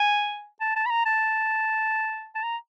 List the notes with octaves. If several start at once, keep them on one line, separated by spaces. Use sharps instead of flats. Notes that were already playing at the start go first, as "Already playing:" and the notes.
Already playing: G#5
A5
A5
B5
A#5
A5
A5
A#5